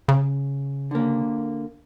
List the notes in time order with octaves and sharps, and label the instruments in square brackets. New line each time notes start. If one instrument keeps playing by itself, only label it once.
[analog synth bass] C#3
[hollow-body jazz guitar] D3 A#3